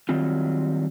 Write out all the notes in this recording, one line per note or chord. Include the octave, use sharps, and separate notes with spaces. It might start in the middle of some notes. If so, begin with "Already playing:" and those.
D#3 F#3 G3 C4 F4